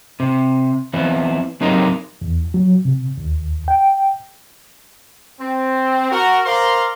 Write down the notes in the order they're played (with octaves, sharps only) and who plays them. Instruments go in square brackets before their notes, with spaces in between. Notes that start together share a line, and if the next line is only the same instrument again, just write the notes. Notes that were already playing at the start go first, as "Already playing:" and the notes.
[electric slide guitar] C3
E3 B3 C4
F#3 C4 D#4 G4 A#4
[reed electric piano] E2
F#3
C3
D#2
G5
[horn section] C4
F#4 A#4
A#4 C5 D5 F5 A#5 C6